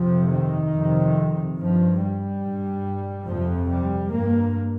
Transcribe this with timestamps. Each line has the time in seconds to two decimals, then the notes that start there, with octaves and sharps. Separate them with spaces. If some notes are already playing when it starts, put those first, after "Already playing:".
Already playing: F2 C3 F3
0.32 D#3
0.73 F2 C3
1.57 G2 F3
2.00 G3
2.42 G2
3.26 F2 C3 F3
3.68 G3
4.10 G2 A#3